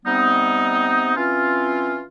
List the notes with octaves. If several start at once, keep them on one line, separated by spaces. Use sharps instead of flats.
C3 G3 B3 C4 D#4
E3 C4 C#4 F4